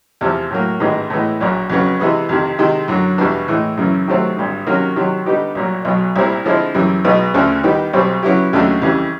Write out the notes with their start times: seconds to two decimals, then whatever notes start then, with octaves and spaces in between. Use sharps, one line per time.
0.21 E2 C3 F3
0.51 A2 F#3 A#3
0.80 A1 G#2 D#3 G#3 B3
1.10 A2 E3 G#3 B3
1.40 A#1 A#2 F#3
1.70 F2 C#3 F#3 B3
2.00 C3 E3 G#3 B3
2.29 F2 C3 D#3
2.58 C3 D#3 G#3
2.88 F#2 D3 F#3
3.18 E2 B2 G3 B3 D4
3.48 A2 E3 G#3
3.77 F#2 C#3 E3
4.08 C3 D#3 F#3 A3 C4
4.37 G#1 G2 D3
4.67 C3 D#3 F#3 A#3 C#4
4.96 C3 D#3 F#3
5.26 D3 G3 B3 D#4 G4
5.55 C2 A#2 F#3
5.85 B1 B2 F#3
6.16 C2 A#2 G3 C4 E4
6.45 D3 F3 G#3 C4 E4
6.75 F#2 C#3 E3 G3
7.05 B1 B2 G#3 B3 D#4
7.34 D2 C#3 F3 A3
7.63 D#3 G3 B3 D#4
7.93 B1 B2 G3 C4
8.23 C#3 F#3 B3 E4 G4
8.53 D#2 C#3 F#3 A3 D4
8.82 F2 C#3 E3 G3